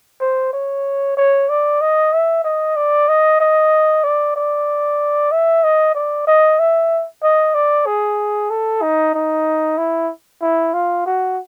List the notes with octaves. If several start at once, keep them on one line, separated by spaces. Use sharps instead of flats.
C5
C#5
C#5
D5
D#5
E5
D#5
D5
D#5
D#5
D5
D5
E5
D#5
D5
D#5
E5
D#5
D5
G#4
A4
D#4
D#4
E4
E4
F4
F#4